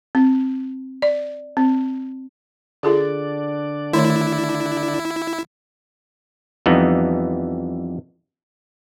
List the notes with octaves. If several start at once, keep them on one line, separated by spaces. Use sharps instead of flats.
C4
D5
C4
D3 D4 F4 G#4 A4 D5
D#3 A3 E4 C#5
F2 E3 G3 B3 D#4